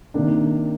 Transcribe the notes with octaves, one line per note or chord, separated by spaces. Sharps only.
C3 D#3 A#3 D4